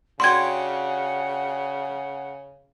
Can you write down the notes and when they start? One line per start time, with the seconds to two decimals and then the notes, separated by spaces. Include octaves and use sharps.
0.20 C#3 D4 F#4 G4 F#5 C6 G#6